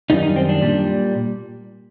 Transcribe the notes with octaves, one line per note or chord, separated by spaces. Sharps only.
F#2 D#3 G3 D#4
D#4
C4
D4
A#2 G3